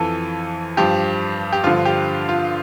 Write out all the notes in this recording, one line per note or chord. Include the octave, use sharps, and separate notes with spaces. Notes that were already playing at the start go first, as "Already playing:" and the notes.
Already playing: F2 E3 A4
G2 F3 G4
G4
G2 D3 F3 F4
G4
F4